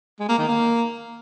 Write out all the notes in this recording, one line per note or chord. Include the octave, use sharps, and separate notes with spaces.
G#3
A#3
D#3
A#3